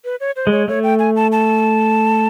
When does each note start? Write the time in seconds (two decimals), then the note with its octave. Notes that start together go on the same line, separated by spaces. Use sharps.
0.05 B4
0.20 C#5
0.36 C5
0.47 G#3 C#5
0.68 A3 C#5
0.83 G5
0.99 G#5
1.16 A5
1.32 A5